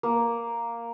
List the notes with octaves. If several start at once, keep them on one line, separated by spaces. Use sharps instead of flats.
A#3